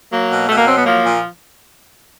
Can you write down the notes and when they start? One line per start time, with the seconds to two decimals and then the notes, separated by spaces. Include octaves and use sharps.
0.12 F#3 A#3
0.31 B2
0.49 B2 A3
0.58 A#3
0.67 F#3 C4
0.77 B3
0.85 F3 A#3
1.04 A#2